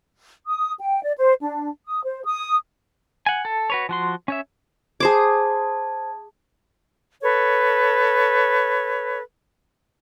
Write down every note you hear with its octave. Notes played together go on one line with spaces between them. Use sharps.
D#6
G5
D5
C5
D4
D#6
C5
D#6
F#5 G#5
A4
F#4 B4 C#5
F3 F#4 C6
C#4 C#5 E5
G#4 C5 A5 D6 G#6
A4 B4 C#5